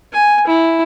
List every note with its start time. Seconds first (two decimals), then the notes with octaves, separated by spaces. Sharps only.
0.13 G#5
0.47 E4